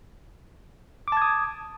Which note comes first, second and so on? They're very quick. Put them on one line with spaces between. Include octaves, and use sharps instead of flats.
D6 A5 G#6 D#6